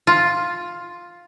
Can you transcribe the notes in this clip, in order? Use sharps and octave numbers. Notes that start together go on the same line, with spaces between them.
F4